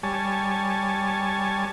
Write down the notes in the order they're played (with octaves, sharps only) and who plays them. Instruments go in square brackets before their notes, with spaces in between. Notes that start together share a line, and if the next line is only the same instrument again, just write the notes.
[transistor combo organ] G3 C#5 G#5 A5